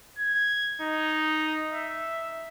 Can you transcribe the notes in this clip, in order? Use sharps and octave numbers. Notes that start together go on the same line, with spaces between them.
G#6
D#4
E5